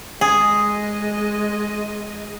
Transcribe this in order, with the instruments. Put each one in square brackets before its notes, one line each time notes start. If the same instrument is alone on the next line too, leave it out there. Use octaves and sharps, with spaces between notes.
[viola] G#3 D#5 [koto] G#4